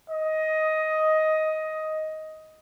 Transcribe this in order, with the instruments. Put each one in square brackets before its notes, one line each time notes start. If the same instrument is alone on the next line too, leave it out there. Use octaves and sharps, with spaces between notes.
[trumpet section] D#5